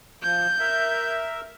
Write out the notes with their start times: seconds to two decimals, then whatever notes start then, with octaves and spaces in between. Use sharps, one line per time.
0.23 F3 G6
0.60 A#4 E5